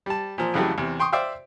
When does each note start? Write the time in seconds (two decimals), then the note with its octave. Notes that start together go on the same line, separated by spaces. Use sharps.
0.06 G3 A5
0.38 A#2 F3
0.54 F2 C#3 E3 F#3 G3 A3
0.78 E2 C3
1.00 G5 C6 C#6 D#6
1.13 C5 D5 E5 F5 G5